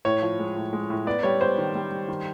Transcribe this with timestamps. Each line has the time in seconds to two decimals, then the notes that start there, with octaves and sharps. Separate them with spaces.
0.05 A2 C#5
0.22 F3
0.39 G#3
0.56 A2
0.73 G#3
0.90 A2
1.07 B3 D5
1.23 G3 C#5
1.41 B3 C5
1.58 D#3
1.75 G3
1.91 G3
2.08 D#3